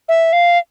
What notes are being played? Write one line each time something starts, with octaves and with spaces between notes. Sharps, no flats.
E5
F5